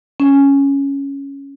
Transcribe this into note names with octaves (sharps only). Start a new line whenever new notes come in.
C#4